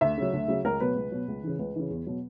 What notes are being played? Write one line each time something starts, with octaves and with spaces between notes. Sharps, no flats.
D2 E5
C#3 F#3
D2
C#3 F#3
C#2 A#4
B2 F#3 B4
C#2
B2 F#3
C#2
C#3 E3
C#2 B4
C#3 E3
E2
B2 F#3